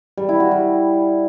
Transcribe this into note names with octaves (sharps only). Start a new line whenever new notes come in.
G3
E4
F#4
G3